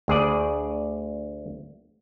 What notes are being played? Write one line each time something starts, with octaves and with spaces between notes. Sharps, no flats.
D2 G#4 D5